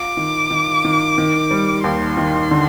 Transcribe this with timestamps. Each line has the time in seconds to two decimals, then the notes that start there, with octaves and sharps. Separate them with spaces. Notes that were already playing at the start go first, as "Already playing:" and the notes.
Already playing: F4 D6
0.17 D#3
0.51 D#3
0.85 D#3
1.18 D#3
1.51 G3
1.84 D#2 C6
2.17 D#3
2.51 D3